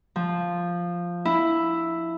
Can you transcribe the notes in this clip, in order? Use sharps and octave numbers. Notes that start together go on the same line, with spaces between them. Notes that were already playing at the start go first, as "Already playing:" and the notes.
F3
E4